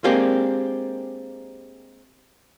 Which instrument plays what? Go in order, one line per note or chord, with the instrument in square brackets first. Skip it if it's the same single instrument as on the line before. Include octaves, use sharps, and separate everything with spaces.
[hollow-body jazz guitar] G#3 A#3 C4 D4 G4